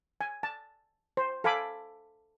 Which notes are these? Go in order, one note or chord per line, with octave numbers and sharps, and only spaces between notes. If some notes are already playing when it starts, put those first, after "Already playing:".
G#5
A5
C5
A4 F5 G#5 B5 D6